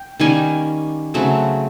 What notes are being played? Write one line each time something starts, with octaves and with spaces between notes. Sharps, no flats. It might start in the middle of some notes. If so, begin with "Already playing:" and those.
Already playing: G5
D#3 G3 A#3 C#4 G#5
C#3 F#3 A3 C4